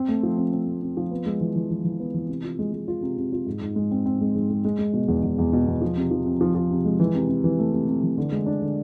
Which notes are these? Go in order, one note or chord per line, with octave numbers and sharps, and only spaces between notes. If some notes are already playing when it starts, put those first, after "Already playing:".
Already playing: C4
A3
F3
C4
C4
A3
C4
F3
B3
G#3
E3
E3
E3
E3
B3
E3
C3
F4
G#3
G#3
F4
C3
C3
F4
G#2
G#2
G#3
C4
C4
G#3
G#2
G#3
G#3
G#3
B2
E2
E2
E2
B2
E2
F3
C3
F3
C3
F3
F3
C3
G#3
E3
C3
C3
E3
A3
C3
C3
E3
D3
G#3
D4
D3